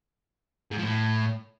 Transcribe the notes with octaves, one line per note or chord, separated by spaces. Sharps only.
G#2
F3
A2